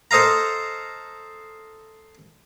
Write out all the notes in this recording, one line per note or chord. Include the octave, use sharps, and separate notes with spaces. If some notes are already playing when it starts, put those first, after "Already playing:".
A4 C5 D#5 F5 A#5